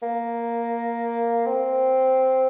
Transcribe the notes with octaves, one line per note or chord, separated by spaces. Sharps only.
A#3
C4